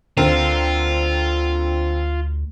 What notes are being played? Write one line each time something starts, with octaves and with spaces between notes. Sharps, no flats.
D2 D3 C4 F4 A#4